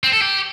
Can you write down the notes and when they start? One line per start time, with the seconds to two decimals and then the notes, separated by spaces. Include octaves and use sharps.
0.04 C4
0.13 A4
0.22 G4